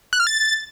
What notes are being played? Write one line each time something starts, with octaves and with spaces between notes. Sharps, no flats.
F#6
F6
A6